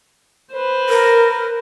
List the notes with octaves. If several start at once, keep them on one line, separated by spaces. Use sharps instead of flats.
B4 C5
A#4